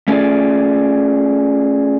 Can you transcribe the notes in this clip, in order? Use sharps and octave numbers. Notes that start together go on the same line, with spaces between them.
A3 C#4 D4 F4 G#4 D5